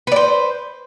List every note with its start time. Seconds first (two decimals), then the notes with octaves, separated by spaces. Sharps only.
0.07 B4
0.12 D5
0.16 C5